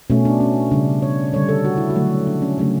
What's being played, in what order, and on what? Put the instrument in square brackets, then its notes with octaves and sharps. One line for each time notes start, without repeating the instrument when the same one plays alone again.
[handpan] B2 A3 C#4
D4
C#4
C#3 G3 D4
C#5
D3 G3 C#5
A4
F#4
E4
F#4
D3 F#3 A3
D4
C#4
C#3 F#3 A3 C#4